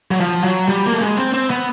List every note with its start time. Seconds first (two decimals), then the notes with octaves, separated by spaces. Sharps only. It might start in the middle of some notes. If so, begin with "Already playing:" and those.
0.11 F#3
0.20 F3
0.44 F#3
0.69 G3
0.86 A#3
0.93 A3
1.01 G#3
1.17 C4
1.34 C4
1.50 B3